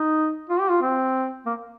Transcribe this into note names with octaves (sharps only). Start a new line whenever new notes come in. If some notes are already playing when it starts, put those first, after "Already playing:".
Already playing: D#4
F4
G4
F4
C4
A#3